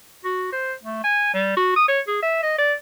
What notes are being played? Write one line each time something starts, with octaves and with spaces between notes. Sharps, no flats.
F#4
C5
A3
G#5
G3
F#4
D#6
C#5
G#4
E5
D#5
D5